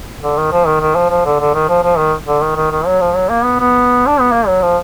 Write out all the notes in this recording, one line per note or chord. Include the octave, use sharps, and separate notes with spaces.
D3
D#3
F3
D#3
D#3
F3
F3
D3
D3
D#3
F3
F3
D#3
D3
D#3
D#3
D#3
F#3
F3
F#3
A#3
B3
B3
D4
B3
A#3
F#3
F3